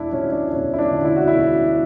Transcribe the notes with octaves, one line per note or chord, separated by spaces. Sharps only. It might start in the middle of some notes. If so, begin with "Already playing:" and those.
Already playing: E1 D4 E4
D2 D3 C#4
D4
E1 C#4
E4
D4
D2 D3
E4
F#4
E1 E4